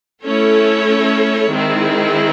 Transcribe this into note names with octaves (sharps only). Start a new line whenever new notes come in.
A3 C#4 E4 A4 C#5
D#3 G#3 C4 E4 G#4